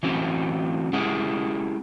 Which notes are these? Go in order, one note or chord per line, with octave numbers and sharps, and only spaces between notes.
E3 F#3 A3 C4 C#4
G#3 C#4 E4 G4 G#4 F#5